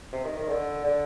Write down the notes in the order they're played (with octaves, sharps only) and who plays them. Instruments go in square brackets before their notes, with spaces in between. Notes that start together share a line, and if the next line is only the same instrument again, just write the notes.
[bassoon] C3
D#3
D#3
D3
D3